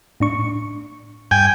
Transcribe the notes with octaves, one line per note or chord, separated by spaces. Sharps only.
A2 D4 C#6
G2 G5 G#5